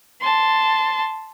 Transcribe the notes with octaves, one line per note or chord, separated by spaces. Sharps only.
A5 C6